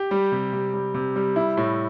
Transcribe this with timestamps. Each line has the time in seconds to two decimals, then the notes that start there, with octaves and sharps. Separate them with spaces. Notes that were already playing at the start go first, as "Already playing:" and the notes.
Already playing: G4
0.11 G3
0.32 C3
0.53 C3
0.74 G3
0.94 C3
1.16 G3
1.36 E4
1.57 A2